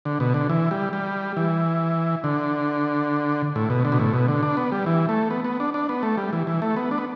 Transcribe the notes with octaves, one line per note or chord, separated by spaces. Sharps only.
D3
B2
D3
E3
G3
G3
E3
D3
A2
B2
D3
B2
A2
B2
D3
D4
B3
G3
E3
A3
B3
B3
D4
D4
B3
A3
G3
E3
E3
A3
B3
D4
B3